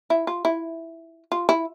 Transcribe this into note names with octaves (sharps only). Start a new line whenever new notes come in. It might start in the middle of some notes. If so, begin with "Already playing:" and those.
E4
F4
E4
F4
E4